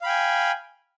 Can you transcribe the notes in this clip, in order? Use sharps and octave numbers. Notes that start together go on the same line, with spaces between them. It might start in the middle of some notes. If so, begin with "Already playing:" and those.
F5 G5 G#5 B5